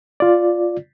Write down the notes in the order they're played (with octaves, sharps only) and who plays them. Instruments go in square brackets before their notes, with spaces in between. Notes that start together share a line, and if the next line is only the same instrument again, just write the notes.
[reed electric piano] F4 D5